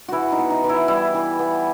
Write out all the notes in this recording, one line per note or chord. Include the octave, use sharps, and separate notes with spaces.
E3 E4 F#4
D#4
B3
D#4
E3
E4
G3 E4
E3
B3